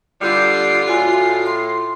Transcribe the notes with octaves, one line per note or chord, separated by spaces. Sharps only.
D3 G3 F4 C7
A2 F#4 G#5
C6